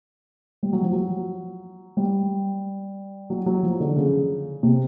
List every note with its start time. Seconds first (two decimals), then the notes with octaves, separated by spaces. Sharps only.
0.63 G3
0.73 F#3
0.82 F3
0.93 F#3
1.97 G3
3.30 F#3
3.46 F#3
3.63 F3
3.80 D3
3.96 C#3
4.63 C3